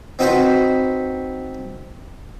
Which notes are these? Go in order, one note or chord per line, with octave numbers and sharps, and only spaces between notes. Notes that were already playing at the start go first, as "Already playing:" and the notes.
C4 D#4 F#4 B4 C5